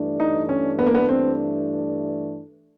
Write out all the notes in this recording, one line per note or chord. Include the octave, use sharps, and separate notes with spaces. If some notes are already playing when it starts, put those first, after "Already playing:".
Already playing: G2 E3 A3 D4
D#4
C#4
B3
A#3
B3
C4